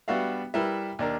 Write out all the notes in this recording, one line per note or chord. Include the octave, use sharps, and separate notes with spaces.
G3 B3 D4 F#4 E5 F5
G3 E4 A#4 B4 E5
D#2 D4 A#4